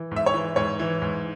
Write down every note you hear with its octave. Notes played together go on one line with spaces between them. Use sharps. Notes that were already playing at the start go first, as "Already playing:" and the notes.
Already playing: E3
G#2 E5
C#5
E3
G#2 C#5
E3
G#2